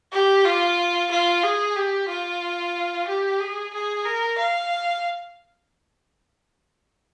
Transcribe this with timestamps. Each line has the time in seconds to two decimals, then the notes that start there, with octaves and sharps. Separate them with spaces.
0.12 G4
0.45 F4
1.11 F4
1.44 G#4
1.76 G4
2.09 F4
3.08 G4
3.41 G#4
3.73 G#4
4.06 A#4
4.38 F5